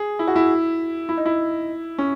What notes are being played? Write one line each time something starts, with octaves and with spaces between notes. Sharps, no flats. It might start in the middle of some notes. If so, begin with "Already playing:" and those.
Already playing: G#4
E4
F#4
E4
E4
D#4
E4
C#4